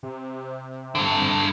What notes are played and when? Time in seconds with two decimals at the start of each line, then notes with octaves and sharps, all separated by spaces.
0.03 C3
0.95 G2 D3